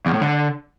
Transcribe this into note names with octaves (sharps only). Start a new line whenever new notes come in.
E2
A2
D3